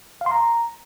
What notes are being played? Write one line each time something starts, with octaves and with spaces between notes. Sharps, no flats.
F5
C6
A#5